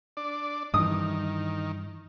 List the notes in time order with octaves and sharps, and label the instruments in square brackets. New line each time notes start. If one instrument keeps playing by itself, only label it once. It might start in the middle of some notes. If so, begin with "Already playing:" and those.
[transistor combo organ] D4 D5
[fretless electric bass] G2 E3 [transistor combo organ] D#3 [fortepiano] D#6